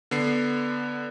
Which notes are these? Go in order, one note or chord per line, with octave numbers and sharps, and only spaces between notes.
D3 B3 C7